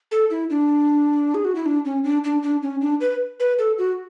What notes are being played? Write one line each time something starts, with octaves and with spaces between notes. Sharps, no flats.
A4
E4
D4
G#4
F#4
E4
D4
C#4
D4
D4
D4
C#4
D4
B4
B4
A4
F#4